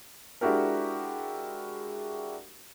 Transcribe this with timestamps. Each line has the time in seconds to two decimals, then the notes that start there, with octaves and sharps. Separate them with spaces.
0.41 G#3 D4 E4 F#4 G4 A#4